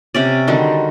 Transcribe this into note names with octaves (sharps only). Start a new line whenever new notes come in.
C3 C#4 D5
D3 D#3 G3 F#4